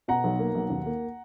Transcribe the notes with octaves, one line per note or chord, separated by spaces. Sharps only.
B2 F#5 A#5
B1
A#3
B1
D#2
A#3